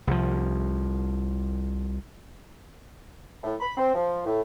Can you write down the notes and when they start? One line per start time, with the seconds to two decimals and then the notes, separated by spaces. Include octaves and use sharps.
0.07 C2 F3
3.44 A2
3.60 B5
3.77 C4
3.95 F3
4.26 A2